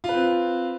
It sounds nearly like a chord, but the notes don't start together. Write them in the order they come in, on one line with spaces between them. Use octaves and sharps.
F4 B4 C4